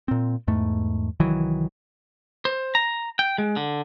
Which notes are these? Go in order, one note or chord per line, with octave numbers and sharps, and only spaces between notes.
A#2 C4
E2 G#2 A3
C2 D#3 E3 F#3
C5
A#5
G5
G#3
D3